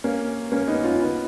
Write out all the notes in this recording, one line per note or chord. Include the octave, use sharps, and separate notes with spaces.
A#3 C#4
A#3 C#4
B3 D#4
C#4 F4
B3 D#4